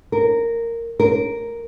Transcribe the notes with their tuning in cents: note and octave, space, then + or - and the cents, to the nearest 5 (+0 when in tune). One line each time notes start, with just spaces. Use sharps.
A#4 -10
A#4 +0